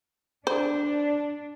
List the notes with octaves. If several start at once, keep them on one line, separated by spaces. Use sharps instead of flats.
D4 C5